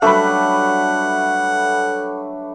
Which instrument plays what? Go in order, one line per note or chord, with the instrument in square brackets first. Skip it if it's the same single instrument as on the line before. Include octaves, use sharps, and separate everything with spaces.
[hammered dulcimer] F#3 G3 D4 [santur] A3 B4 [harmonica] F#5